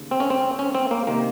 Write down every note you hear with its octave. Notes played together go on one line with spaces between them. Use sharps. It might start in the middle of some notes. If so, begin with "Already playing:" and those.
Already playing: D#2 C#3
C4
C#4
C4
C#4
C4
A#3
C3 D#3 A#3